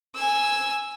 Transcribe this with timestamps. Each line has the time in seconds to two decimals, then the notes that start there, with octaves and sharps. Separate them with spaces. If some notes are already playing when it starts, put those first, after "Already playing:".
0.16 G#5 E6